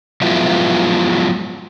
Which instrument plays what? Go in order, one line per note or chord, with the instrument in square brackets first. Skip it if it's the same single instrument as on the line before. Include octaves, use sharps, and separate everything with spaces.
[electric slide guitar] F3 F#3 G#3 B3 E4 F4